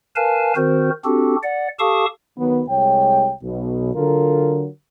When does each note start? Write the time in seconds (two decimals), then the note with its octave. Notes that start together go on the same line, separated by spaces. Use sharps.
0.16 A#4 B4 F5 G#5 A5
0.56 D#3 C4 F#4 A#4 C5
1.04 C4 D4 F#4 G4 A4
1.43 D5 F#5
1.79 G4 A4 F5 A5 C#6 D#6
2.37 D#3 F#3 B3
2.68 C2 G#3 G4 C#5 G5
3.42 B1 B2
3.94 D3 F#3 F4 A4 A#4